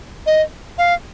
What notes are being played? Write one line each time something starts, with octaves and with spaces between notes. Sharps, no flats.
D#5
F5